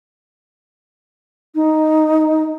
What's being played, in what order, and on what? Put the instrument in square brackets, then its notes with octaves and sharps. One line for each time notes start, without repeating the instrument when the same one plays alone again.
[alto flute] D#4